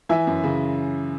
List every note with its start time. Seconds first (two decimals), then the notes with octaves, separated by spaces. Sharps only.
0.09 E3 E5 G#5
0.27 F#2
0.44 C#3